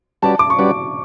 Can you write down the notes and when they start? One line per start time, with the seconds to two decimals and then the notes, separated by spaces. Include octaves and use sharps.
0.22 G3 C#4 F#4 B4 D5 A5
0.39 D6
0.50 C#6
0.59 G3 C#4 F#4 B4 D5